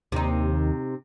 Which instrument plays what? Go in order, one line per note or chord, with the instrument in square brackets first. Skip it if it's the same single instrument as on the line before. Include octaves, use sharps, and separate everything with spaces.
[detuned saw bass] D#2 [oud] C3 D#4